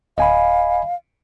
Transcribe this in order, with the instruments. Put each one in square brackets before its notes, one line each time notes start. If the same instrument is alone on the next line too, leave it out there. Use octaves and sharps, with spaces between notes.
[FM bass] D1 [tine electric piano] D#5 G#5 B5 [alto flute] F5